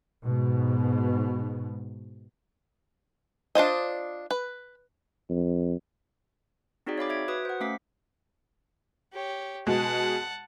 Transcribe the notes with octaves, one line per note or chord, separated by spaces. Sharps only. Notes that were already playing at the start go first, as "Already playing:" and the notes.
G#2 B2
D4 F4 C5 D#5
B4
F2
C4 D#4 F#4 G#4 D5 G5
C#5 F5 B5 D6
E5 G#6 D7
F#4 B4 D#6
C5 F#5
A3 C#4 F5 D6 B6
G4 C#5
B2 G#3 F#5 A5